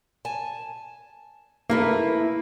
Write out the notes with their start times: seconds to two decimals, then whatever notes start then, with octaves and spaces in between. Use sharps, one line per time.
0.25 G#5 A5
1.70 A3 A#3 E4 B4